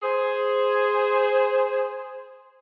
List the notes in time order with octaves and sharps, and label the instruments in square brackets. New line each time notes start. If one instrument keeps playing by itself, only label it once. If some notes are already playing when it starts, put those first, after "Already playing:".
[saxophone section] G#4 C5